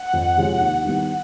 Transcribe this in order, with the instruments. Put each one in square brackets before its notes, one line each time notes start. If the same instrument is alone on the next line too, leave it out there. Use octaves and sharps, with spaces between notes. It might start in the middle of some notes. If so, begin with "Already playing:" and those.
Already playing: [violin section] F#5
[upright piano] F2
C3 F3 G#3 C#4
D#2
D#3 G3 B3 E4